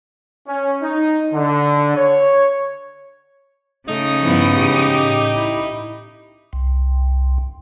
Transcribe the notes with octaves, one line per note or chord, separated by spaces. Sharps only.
C#4
D#4
D3
C#5
C#3 A3 D#4 D#6
G2 F3 B3 E4
G#2 E3 G4
A2
E4
C2